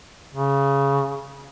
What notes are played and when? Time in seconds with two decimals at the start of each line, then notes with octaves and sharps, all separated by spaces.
0.34 C#3